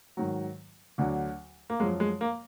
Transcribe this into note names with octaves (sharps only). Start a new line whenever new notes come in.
G#2 D#3 F#3
D2 D3 F#3
A#3
F#2 F3 G#3
G#3
A#3